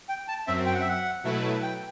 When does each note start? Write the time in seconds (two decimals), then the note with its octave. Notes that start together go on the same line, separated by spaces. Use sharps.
0.09 G5
0.28 A5
0.47 F#2 F#3 C4 E5
0.66 G5
0.74 F#5
0.81 E5
0.89 F#5
1.24 B2 F#3 A3 E4 B4
1.63 G5